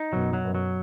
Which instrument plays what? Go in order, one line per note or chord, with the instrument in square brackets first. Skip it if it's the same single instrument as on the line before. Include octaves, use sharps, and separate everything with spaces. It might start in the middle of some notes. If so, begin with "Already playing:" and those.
Already playing: [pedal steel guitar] D#4
[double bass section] F#2 B2 [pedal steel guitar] F#3
[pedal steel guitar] F#3
[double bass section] F#2 B2
[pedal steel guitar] F#3